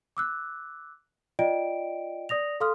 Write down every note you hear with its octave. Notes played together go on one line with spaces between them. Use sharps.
D6 E6 F#6
F4 D5 D#5 G5 D7
D5 D#6 A#6 F7
A4 F5 C6 D#6 F6